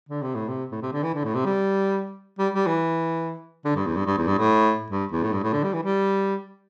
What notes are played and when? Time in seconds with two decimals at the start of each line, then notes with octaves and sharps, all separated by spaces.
0.09 D3
0.22 C3
0.35 A2
0.48 C3
0.72 A2
0.82 C3
0.93 D3
1.03 E3
1.14 D3
1.24 A2
1.35 C3
1.45 G3
2.39 G3
2.54 G3
2.67 E3
3.65 D3
3.76 G2
3.86 E2
3.96 G2
4.06 G2
4.18 E2
4.27 G2
4.39 A2
4.90 G2
5.12 E2
5.23 A2
5.32 G2
5.43 A2
5.53 D3
5.63 G3
5.74 E3
5.83 G3